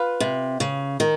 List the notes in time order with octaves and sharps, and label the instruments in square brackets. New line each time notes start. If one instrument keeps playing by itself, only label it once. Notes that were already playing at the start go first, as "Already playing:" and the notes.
Already playing: [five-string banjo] F4 B4
[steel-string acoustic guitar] C3
C#3
D#3